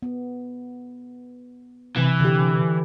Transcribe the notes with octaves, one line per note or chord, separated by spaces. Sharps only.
B3
C3 E3
D3 G4